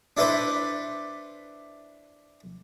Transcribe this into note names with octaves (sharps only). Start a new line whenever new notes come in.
D4 E4 A4 B4 C5 D5